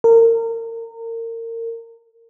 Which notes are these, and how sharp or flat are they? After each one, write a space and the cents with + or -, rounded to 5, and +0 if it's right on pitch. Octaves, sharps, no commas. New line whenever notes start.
A#4 -30